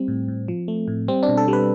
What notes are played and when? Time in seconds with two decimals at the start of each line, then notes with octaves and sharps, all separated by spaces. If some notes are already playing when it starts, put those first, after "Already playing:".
Already playing: G3 C4
0.08 A2
0.28 A2
0.48 F3
0.68 A3
0.88 A2
1.08 G3 C4
1.23 D4
1.28 B2
1.37 A4
1.48 G3
1.53 B4